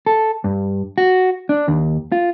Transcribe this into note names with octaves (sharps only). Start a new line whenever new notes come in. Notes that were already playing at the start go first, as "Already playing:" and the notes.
A4
G2
F#4
D4
D#2
F4